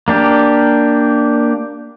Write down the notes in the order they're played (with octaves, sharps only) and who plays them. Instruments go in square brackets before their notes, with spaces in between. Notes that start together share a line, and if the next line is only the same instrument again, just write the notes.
[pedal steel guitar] A#3 D4 G4